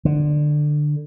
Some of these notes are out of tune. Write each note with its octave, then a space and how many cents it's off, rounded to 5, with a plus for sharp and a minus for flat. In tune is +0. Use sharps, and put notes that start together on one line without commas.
D3 +15